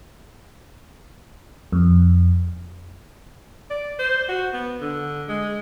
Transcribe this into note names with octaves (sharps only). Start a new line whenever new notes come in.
F2
D5
C5
F#4
B3
D3
G#3